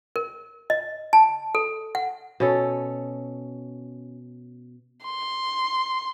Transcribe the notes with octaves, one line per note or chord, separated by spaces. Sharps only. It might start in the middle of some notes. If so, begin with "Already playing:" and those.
A#4
D#5
A5
A4
F#5
B2 C#4 A4
C6